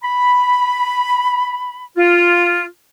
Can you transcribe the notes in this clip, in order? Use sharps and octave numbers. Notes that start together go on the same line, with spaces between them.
B5
F4